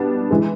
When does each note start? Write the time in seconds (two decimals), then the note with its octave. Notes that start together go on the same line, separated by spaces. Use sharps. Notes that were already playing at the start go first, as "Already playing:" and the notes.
Already playing: B2 G3 B3 D4
0.31 E3 G#3